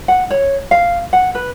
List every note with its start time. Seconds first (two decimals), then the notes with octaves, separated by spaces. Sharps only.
0.08 F#5
0.31 C#5
0.71 F5
1.13 F#5
1.35 B4